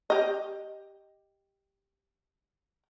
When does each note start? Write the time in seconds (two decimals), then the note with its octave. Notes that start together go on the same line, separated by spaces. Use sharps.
0.10 G4 D#5